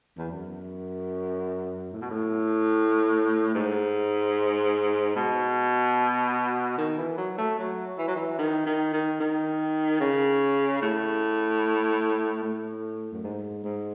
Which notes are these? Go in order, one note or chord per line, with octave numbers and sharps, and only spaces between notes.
E2
F#2
A2
B2
A2
G#2
B2
D#3
E3
F#3
A3
F#3
E3
F#3
E3
D#3
D#3
D#3
D#3
C#3
A2
A2
F#2
G#2
G#2